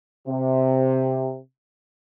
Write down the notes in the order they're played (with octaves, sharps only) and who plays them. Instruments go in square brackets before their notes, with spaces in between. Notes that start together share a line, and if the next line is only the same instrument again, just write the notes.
[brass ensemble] C3